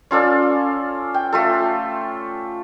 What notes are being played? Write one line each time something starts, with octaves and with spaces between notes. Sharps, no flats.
C#4 F4 A4 D5
G5
A3 F4 A4